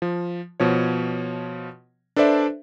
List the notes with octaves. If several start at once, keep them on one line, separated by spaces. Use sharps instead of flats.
F3
B2 F3 C#5
D4 A4 B4 C5 D5 E5